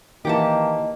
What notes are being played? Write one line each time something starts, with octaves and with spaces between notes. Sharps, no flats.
D#3 E3 A#3 G4 D#5 F#5 A5